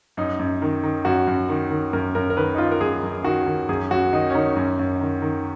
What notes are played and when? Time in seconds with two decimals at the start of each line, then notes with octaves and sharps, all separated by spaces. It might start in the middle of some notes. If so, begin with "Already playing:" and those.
0.17 F#2 D#4
0.39 F#2
0.62 D#3
0.84 D#3
1.05 F#2 F#4
1.27 F#2
1.49 D#3
1.71 D#3
1.93 F#2 A#4
2.15 F#2 A#4
2.30 A#4
2.36 D#3 B4
2.55 D#4
2.58 D#3 F4
2.72 A#4
2.80 F#2 G#4
3.03 F#2
3.24 D#3 F#4
3.46 D#3
3.69 F#2 G#4
3.90 F#2 F#4
4.13 D#3 D#4
4.30 C#4
4.35 D#3 D#4
4.56 F#2
4.79 F#2
5.01 D#3
5.22 D#3